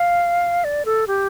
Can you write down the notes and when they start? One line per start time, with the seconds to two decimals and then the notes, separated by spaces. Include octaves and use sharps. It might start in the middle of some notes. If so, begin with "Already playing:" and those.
Already playing: F5
0.64 D5
0.85 A4
1.07 G4